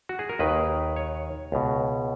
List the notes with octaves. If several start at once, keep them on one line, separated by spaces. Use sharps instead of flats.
F#4
G#4
A#4
D#2 D#3 B4
C#5
C#2 B2